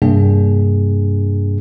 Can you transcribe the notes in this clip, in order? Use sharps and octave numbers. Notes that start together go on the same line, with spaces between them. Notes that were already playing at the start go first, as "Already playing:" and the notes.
G2 C3 A#3 D4 G#4